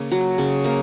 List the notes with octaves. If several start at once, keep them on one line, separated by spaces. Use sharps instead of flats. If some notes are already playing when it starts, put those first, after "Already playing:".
Already playing: C#3 A#3
F#3
C#3
A#3